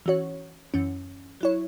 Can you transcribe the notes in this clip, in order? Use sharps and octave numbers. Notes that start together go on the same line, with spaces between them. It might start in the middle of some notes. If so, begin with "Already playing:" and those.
E3 C#4 F#4 C#5
F#2 E3 C#4
F#3 E4 C#5